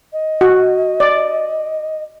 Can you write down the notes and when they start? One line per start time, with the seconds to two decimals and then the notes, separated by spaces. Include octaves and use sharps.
0.13 D#5
0.41 F#4
1.00 D5